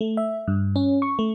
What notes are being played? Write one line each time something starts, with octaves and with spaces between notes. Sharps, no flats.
A3
E5
G2
C#4
C#6
A3